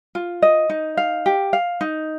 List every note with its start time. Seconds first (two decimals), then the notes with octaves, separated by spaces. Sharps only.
0.15 F4
0.42 D#5
0.70 D#4
0.97 F5
1.26 G4
1.53 F5
1.81 D#4